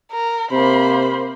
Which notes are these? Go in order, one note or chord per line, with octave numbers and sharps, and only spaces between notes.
A#4
C3 A#3 C5 B5